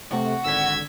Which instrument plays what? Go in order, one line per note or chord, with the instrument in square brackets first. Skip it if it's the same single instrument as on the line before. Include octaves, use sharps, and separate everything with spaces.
[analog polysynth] C3 A3 [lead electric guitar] F#4
[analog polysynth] G#1 D3 B6 [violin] E6 G#6